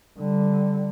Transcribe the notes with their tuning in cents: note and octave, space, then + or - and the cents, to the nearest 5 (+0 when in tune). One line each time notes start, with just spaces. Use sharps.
D3 +0 G3 +0